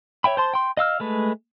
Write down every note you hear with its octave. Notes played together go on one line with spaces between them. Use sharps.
C#5 E5 G5 B5
C5 A5 C6
G5 C6
D#5 F5 E6 F6
G#3 A3 B4